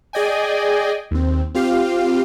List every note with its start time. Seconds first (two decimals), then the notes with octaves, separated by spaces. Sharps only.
0.13 G#4 D5 D#5 G5 G#5
1.11 D#2 C4
1.55 C4 F4 G4 F5